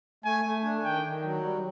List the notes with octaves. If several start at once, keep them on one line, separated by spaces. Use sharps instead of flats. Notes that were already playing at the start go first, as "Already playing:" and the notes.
A3 G#5
A3
D4
D#3 G5
D#3
F#3
G3